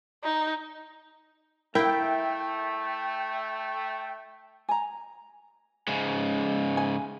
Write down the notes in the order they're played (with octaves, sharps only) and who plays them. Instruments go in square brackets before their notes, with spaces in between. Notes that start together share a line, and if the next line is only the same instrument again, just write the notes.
[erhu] D#4
[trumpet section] A3 [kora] E4 [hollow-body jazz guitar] A#4 F5 [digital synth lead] G5
[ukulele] G#5 A#5
[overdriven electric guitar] G#2 C#3 [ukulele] C#4
[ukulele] G#5